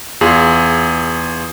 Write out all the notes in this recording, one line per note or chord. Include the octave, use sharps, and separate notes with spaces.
E2 F4 G#4